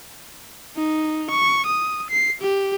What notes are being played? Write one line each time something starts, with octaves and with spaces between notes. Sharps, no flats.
D#4
C#6
D#6
C7
G4